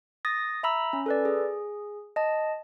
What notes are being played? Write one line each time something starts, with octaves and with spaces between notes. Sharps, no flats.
D#6 A6 A#6
E5 A#5 B5 E6
C#4
A4 B4 D5
G#4
D#5 A5